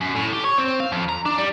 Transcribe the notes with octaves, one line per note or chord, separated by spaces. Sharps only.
F#2
A2
G4
C#5
C4
F5
F2
A#5
D4
G3